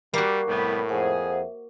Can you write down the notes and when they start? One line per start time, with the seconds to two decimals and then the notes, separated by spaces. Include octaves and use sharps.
0.14 G3 A#3 F#4
0.48 C2 A2 G3 B3
0.89 F2 G#4 C5 E5 F#5